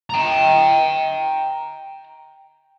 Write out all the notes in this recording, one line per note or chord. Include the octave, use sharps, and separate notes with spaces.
G5 A#5